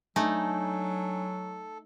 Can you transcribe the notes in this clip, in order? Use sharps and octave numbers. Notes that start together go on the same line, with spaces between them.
F#3 A3 D4 D#4 A4 G#5